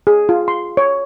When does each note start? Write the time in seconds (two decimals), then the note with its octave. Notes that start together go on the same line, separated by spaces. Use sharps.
0.07 G#4
0.29 F4
0.48 C6
0.77 C#5